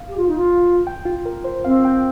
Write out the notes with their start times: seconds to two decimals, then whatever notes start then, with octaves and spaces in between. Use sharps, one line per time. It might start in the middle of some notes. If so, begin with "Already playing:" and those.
Already playing: F5
0.08 G4
0.17 F4
0.28 D#4
0.37 F4
0.87 G5
1.05 F4
1.26 A#4
1.44 C5
1.65 C4 F5
1.85 G5